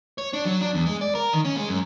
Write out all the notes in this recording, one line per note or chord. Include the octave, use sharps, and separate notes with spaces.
C#5
D4
F#3
D4
E2
G#3
D5
A#4
D#3
C#4
G#3
F#2